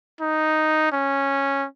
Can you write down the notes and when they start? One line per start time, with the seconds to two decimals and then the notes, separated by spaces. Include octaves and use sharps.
0.21 D#4
0.92 C#4